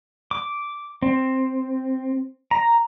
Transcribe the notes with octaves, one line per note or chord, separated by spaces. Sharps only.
D6
C4
A#5